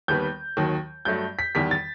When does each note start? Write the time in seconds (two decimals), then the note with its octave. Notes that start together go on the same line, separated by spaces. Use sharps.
0.08 D#2 D#3 G3 B3 G6
0.57 D#2 D#3 F#3
1.05 G2 F#3 A3 G6
1.39 B6
1.55 E2 D#3 G3 B6
1.71 A6